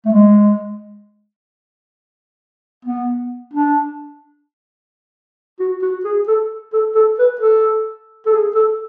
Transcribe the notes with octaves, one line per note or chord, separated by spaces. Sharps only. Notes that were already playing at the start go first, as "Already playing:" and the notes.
A3
G#3
B3
D4
F#4
F#4
G#4
A4
A4
A4
B4
A4
A4
G#4
A4